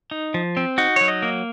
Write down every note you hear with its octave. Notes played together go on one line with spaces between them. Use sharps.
D#4
F3
C4
D#4 F#4
F#3 C#5
D#5
A#3